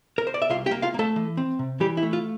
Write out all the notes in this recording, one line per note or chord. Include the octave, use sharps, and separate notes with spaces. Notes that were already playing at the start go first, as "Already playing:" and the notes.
A#4
C5
D5
E5
C2 F4 F5
G4 G5
A#3
F4 F5
A#3
A3 A4
E3
C4
C3
E3 G3 G4
E4
A3
F4